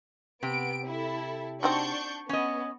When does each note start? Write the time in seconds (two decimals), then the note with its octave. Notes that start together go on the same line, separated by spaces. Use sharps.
0.43 C3 B3 D7
0.87 E4 A4
1.63 C4 D4 D#4 F#4 C#6 G6
2.29 B3 C#4 D#5